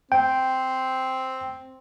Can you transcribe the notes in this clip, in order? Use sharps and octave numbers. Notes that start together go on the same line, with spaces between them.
C4 G5